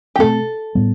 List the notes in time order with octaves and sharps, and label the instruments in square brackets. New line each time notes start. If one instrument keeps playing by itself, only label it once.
[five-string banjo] G4
[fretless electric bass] B2 A3 C4 [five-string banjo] A4
[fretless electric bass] A2 G3 B3